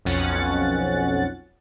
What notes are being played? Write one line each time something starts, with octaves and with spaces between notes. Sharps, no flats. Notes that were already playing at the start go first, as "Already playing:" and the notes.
B1 F2 C#4 F#5 A6